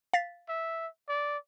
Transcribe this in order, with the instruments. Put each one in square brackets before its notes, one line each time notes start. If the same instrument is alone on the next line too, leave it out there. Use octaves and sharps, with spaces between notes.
[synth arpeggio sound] F5 A6 B6
[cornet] E5
D5